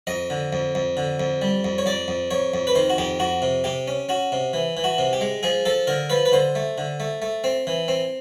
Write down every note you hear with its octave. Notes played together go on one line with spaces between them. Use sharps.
F2 D#5
D3
F2
F2
D3
F2
G3
F2
C#5
F2 D5
F2
F2 C#5
F2
B4
D#3 C5
F#4
F2 G4
F2 F#4
C3
C3 G4
C#4
C#4 F#4
C3
E3
E3
F#4
C3
G4
G#3
F3 G#4
F3 A4
D3 A#4
F3 B4
B4
D3 C5
A3
D3
A3
A3
C4
E3
C4